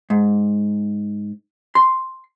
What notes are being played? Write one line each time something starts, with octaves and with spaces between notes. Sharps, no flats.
G#2
C6